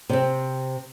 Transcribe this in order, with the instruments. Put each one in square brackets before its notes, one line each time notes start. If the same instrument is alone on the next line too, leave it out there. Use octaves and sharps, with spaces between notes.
[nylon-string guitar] C3 C4